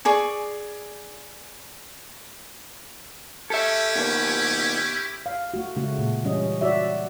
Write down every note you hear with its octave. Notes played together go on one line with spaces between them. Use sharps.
G#4 D5 C#6
C#4 E4 G4 A4 E5
B2 D#3 A#3
F5
A3 F#4
C#3 G#3 A3 F#4
A#2
E3 G3 C#4 D#5
F#4 D5 E5